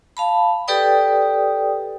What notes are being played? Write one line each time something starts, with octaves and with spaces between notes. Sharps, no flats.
F5 A5 B5
G4 A4 B4 D5 G5 D#6